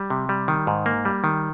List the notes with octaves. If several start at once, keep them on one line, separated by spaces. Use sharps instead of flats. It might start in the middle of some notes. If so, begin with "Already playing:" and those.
Already playing: G3
C3
G3
D#3
G#2
A#3
G3
D#3